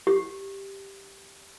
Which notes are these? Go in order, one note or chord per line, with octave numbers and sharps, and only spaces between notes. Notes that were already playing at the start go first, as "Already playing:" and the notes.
G4